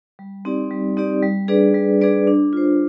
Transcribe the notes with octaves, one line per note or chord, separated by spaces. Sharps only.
G3
C4 D#4 G4 D5
G3
C4 D#4 G4 D5
G3
D4 G#4 B4 D5
G3
D4 G#4 B4 D5
D4
F4 C5